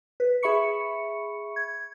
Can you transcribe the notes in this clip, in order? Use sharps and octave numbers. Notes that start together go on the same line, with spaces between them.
B4
G#4 E5 B5 C#6 C#7
G#6